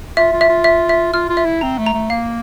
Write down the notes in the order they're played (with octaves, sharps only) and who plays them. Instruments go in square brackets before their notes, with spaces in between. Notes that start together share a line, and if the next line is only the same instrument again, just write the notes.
[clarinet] F4 [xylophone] E5
[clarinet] F4
[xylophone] E5
[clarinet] F4
[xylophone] E5
E5
[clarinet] F4 [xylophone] F6
[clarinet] F4
[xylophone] E5
[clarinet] E4
[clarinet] C4 [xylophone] A#5
[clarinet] A3
[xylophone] A#5
[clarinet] A3
[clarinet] A#3 [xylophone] F5